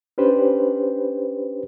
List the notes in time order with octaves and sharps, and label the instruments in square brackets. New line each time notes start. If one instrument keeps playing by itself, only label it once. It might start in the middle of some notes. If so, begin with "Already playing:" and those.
[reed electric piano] C#4 D4 G4 B4 C5